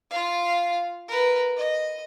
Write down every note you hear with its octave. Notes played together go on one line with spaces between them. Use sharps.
F4 F5
A#4 B4
D#5